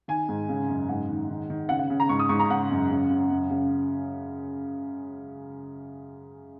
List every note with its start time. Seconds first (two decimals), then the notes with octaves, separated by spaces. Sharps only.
0.08 D#3 G#5
0.29 G#2
0.49 C#3
0.68 F#2
0.89 G#2 F#5
1.10 D#3
1.29 D#3
1.50 D#3
1.69 C#3 F#5
1.79 F#5
1.90 C#3
2.00 A#5
2.09 G#2 C#6
2.20 D#6
2.29 G#2 C#6
2.39 A#5
2.50 C#3 F#5
2.70 F#2
2.91 C#3
3.10 C#3
3.30 F#2
3.50 C#3